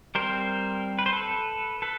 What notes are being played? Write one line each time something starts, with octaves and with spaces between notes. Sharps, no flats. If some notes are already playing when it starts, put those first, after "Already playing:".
G3 C4 A#4 C5
B4
C5
A4 B4
A4 B4